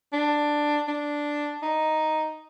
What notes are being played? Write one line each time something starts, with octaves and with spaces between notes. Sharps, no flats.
D4
D4
D#4